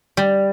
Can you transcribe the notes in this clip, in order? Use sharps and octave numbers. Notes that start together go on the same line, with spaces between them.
G3